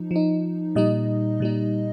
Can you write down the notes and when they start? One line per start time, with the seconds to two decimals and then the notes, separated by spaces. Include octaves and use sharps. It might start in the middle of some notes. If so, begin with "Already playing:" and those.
Already playing: F3 D#4
0.11 F3 D#4
0.75 A#2 G3 D#4 D#5
1.40 A#2 G3 D#4